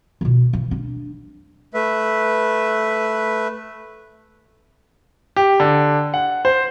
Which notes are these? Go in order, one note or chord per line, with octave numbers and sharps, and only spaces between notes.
B2 E3
E3
D4
A3 B4 E5
G4
D3
F#5
C5